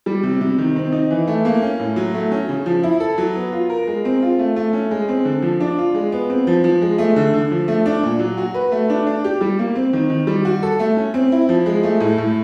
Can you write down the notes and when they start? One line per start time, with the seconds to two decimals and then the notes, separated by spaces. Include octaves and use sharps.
0.06 G3
0.23 C3
0.41 C3
0.58 D#3
0.76 C4
0.92 D#4
1.11 E3
1.27 A3
1.45 A#3
1.62 C#4
1.80 A2
1.96 F#3
2.14 A3
2.32 C#4
2.49 C#3
2.66 F3
2.83 E4
3.00 A4
3.18 F#3
3.35 B3
3.52 F4
3.70 A#4
3.87 G#3
4.05 C4
4.22 F4
4.39 A3
4.56 A3
4.73 C#4
4.91 G#3
5.09 C4
5.25 D3
5.42 F3
5.60 D4
5.78 F4
5.95 G#3
6.12 B3
6.30 C4
6.47 F3
6.64 F3
6.82 G#3
6.98 A3
7.16 D3
7.34 D3
7.51 F3
7.68 A3
7.86 D4
8.03 A#2
8.19 F#3
8.37 F#4
8.54 B4
8.72 A3
8.90 D4
9.07 D4
9.24 G4
9.41 G3
9.59 A#3
9.75 C4
9.93 D#3
10.10 D#3
10.27 G3
10.45 F#4
10.63 A4
10.80 A3
10.97 C#4
11.14 C4
11.32 E4
11.49 F3
11.66 G#3
11.83 A3
12.00 A2
12.18 A2